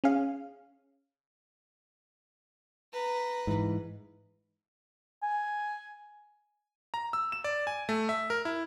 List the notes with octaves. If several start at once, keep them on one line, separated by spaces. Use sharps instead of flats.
C#4 G#4 F5
B4 A#5
G#2 E3
G#5
A#5
E6
E7
D5
G#5
A3
E5
A#4
E4